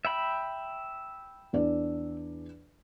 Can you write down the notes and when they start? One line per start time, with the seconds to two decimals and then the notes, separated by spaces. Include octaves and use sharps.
0.05 E5 G5 B5
1.53 E2 D4 D5